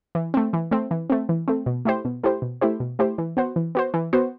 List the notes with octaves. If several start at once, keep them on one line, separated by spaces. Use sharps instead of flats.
E3
A3 C4
E3
A3 C4
E3
A3 C4
E3
A3 C4
B2
A3 E4 G4 C5
B2
A3 E4 G4 C5
B2
A3 E4 G4 C5
B2
A3 E4 G4 C5
E3
B3 F#4 C5
E3
B3 F#4 C5
E3
B3 F#4 C5